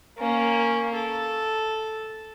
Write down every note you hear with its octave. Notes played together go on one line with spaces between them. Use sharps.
A#3 C#4
A4